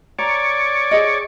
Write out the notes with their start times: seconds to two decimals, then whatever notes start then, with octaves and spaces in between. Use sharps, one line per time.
0.19 C#5 D5 A#5
0.91 G#4 D#5